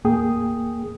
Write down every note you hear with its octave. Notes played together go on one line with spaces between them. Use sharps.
D#2 A2 A#3 G#4 G5 D#6